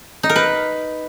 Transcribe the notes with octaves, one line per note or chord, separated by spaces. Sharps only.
D#4
A#4
B4